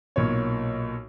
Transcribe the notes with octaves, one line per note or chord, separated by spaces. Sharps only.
B1 A#2 C#5